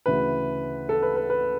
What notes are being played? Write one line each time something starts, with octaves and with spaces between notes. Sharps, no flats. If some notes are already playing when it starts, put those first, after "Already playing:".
D2 C#3 E3 B4
A4
B4
B4
B4